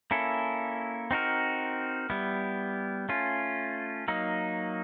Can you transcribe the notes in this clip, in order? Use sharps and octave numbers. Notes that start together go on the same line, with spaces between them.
A#3 C#4 E4 A4
C4 D#4 F#4 A#4
G3 B3 E4
A3 C#4 F4
F#3 A#3 D#4